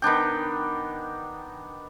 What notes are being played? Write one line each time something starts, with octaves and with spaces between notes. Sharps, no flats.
D#3 B3 D4 G5